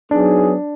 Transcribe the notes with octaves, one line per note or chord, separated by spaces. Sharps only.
F#3 B3 D4 D#4 G#4